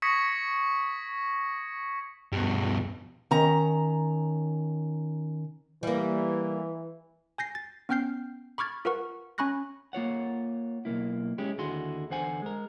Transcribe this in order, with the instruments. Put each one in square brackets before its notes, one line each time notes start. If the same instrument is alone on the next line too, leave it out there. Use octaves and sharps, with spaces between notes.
[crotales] C#6 D#6 G#6 A#6 B6 C#7
[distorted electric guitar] G2 B2
[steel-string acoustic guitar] D#3 C#4 A#5
[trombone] E3 [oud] G3 A#3
[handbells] G#5 G6 A#6 C7
A6
B3 C#4 G5 F6 G6 C7
B5 C#6 D6 F6 G#6 A6
F4 A#4 B4 F#5 C#6
C#4 G#5 B5 C#6 F#6 A#6
[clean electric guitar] A#3 F4 C#5 F#5
B1 F2 A#3 E4
G#3 C#4 E4 G4
D#2 D3 E4 F#4 G#4 C6
E2 D3 C5 F#5 G#5
G#3 A#4